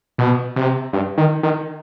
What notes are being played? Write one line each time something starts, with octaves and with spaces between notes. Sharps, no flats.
B2
C3
G2
D#3
D#3